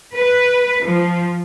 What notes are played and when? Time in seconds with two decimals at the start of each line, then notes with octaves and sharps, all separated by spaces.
0.14 B4
0.84 F3